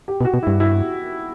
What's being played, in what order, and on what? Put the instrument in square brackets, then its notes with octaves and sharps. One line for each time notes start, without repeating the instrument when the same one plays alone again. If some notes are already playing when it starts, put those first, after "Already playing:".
[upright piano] G4
[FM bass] B2
[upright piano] F#4
[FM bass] B2
[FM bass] G2 [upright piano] E4
[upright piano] E4